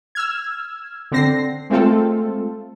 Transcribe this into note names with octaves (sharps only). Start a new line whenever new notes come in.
E6 F6 G#6
D3 C4 A#6 C7
G#3 A3 C4 F4 A4